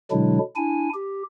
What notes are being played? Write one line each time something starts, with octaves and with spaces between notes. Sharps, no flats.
B2 D3 F#3 G#3 D4 E4
D4 E4 G#5
G4